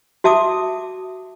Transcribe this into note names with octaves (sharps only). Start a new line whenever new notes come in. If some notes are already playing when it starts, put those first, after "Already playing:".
F#4 E5 A5 D6 D#6